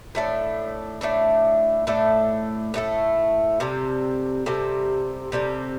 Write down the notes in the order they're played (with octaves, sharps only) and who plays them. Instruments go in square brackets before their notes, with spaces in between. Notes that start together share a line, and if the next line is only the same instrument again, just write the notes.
[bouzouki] A2 A3 D4 A4
A2 A3 D4 A4
A2 A3 D4 A4
A2 A3 D4 A4
C3 G3 C4 A4
C3 G3 C4 A4
C3 G3 C4 A4